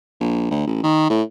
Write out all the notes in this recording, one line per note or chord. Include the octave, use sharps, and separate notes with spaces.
A#1
D2
A1
D#3
A2